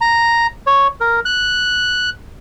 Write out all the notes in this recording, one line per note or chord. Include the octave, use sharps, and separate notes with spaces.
A#5
C#5
A#4
F#6